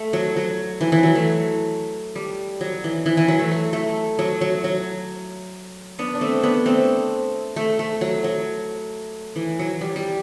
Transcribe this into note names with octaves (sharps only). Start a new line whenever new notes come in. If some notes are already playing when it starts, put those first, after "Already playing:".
Already playing: A3
F#3
F#3
E3
E3
F#3
A3
G3
F#3
E3
E3
E3
F#3
A3
A3
A3
F#3
F#3
F#3
B3 D4
D4
A3 C4
B3 D4
A3 C4
A3
A3
F#3
F#3
E3
F#3
G3
G3